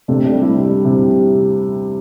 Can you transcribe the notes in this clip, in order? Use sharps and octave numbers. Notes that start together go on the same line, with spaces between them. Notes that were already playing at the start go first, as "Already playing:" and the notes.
C3 A3 D4
A3 D4
G3
C4 E4
G3
C3